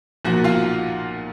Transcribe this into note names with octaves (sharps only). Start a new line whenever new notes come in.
B1 A#2 F3 A#3 F#4 F#5
F4 F5